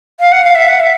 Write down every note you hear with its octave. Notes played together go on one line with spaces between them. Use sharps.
F5
F#5
F5
E5
F#5
E5